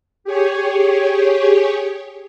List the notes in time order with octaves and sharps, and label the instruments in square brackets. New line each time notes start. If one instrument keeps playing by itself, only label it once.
[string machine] G4 G#4 C#5